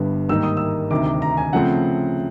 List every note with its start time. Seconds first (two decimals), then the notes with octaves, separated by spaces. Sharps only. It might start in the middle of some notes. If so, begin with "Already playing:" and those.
Already playing: G1 G2 D3 G3 B3
0.29 G#2 D#3 G3 A#3 D#4 E6
0.43 D#6
0.57 E6
0.90 D2 C3 D#3 D6
1.06 D6
1.22 A#5
1.37 G#5
1.53 C#3 F3 A3 C4 F#5